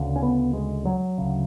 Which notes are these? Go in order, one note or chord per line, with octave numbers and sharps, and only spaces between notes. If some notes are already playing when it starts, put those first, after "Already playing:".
Already playing: D2 C#3
C#4
B3
G#3
F#3
D2 C#3